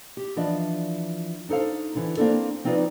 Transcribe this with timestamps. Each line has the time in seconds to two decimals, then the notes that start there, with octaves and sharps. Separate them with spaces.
0.17 G4
0.36 E3 F3 D4 D#5 A5
1.49 D4 D#4 A4 C5 F5
1.95 D3 E3
2.17 A#3 C4 D4 A4
2.64 F3 C4 D#4 F4 B4 D5